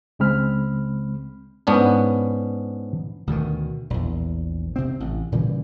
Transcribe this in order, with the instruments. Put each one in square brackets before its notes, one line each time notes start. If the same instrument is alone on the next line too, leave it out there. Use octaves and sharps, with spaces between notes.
[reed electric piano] C#2 C#3 G#3 C4 B5 F6
[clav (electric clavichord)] G#2 B3 C#4 D4
[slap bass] D2 B2 D#3
A#1 E2
C3 C4
A1
A#2 C#3 E3 G3